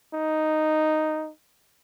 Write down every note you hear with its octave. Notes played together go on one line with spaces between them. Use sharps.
D#4